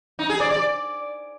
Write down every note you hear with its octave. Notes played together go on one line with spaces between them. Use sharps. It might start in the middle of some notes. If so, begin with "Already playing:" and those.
D#4
G#4
D5
D5